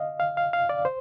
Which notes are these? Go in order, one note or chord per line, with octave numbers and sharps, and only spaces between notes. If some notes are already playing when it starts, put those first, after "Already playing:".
Already playing: D#5 F5
F5
F5
F5
D5
C5